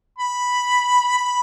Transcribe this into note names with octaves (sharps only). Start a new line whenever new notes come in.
B5
B5